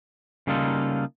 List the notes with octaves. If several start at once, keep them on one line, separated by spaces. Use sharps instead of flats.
C#3 G3 A#3 D#4 F4 A4